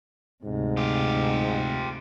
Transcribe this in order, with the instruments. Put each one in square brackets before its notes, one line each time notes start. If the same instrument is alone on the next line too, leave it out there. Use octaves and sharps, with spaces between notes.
[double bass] D2 C3 [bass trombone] G#2
[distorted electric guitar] F4 G4